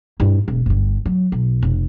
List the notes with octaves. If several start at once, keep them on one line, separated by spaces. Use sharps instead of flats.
G2 E4
E1
G1 G2
F#3
B1
F1